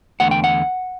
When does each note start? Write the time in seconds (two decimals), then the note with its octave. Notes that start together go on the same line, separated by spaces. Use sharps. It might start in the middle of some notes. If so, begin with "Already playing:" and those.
0.20 E2 D3 A3 F#5
0.31 G5
0.44 F#5